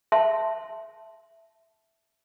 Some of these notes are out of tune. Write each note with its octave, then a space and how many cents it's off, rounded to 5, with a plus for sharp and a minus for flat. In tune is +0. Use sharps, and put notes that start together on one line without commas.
E5 +0 A5 +0 C6 +0